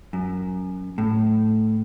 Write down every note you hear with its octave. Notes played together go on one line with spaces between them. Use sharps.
F#2
A2